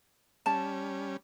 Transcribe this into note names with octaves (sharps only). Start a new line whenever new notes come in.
G3 C#4 A5